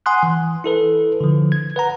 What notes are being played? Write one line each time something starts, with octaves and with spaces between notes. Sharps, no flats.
F#5 G#5 C6 D#6 F#6
E3
E4 A4 B4
D3 F3
G#6
B4 F#5 A#5